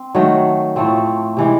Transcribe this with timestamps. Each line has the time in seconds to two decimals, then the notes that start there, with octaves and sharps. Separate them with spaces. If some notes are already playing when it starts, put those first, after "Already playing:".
Already playing: C4
0.15 D#3 F#3 A3
0.76 A2 F3 A3 C4
1.37 C3 E3 G#3